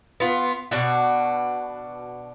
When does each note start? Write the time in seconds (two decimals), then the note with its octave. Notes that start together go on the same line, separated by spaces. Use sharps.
0.20 B3 F4
0.71 B2 D4 F#4